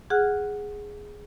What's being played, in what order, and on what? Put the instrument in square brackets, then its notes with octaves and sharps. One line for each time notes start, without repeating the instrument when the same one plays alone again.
[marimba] G#4 F#5 F6 F#6